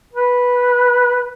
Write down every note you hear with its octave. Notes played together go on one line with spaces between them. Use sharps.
B4